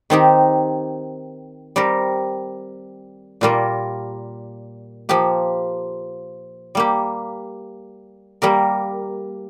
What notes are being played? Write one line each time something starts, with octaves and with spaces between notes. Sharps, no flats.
D#3 C4 D#4 G4
G3 C4 G4 A#4
A#2 G3 A#3 F4 A#4
F3 A#3 G4
G3 A#3 G4
G3 A#3 G4 A#4